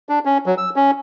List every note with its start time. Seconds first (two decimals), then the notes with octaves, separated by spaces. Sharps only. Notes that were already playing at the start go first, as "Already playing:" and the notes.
0.09 D4
0.25 C#4
0.46 F#3
0.58 E6
0.76 C#4